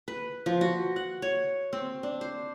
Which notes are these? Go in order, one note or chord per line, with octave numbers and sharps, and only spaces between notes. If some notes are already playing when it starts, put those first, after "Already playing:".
B4
F3
F#4
F#5
C#5
C4
D4
C5